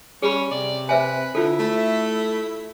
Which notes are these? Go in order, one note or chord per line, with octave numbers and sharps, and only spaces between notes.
G3 C#4 G#4 B5
C3 D5
B4 C5 E5 G#5
D3 E4 F4 A4
A3